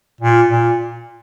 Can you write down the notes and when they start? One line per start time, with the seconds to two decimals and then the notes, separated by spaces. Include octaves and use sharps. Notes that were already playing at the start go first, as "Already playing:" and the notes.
0.21 A#2
0.51 A#2